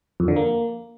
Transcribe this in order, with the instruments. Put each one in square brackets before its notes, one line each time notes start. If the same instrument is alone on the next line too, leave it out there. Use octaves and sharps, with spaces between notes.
[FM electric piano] F2
D3
A#3